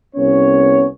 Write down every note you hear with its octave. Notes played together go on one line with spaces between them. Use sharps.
C2 B3 C#4 C#5